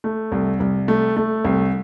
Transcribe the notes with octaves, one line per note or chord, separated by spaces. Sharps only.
A3
C2
C2
A3
A3
C2